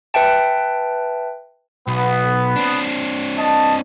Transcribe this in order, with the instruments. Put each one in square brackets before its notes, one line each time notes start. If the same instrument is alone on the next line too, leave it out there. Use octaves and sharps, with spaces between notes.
[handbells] B4 E5 G5 A5
[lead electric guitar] B1 [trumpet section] B3
[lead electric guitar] C4 D4
[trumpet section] D#5 A5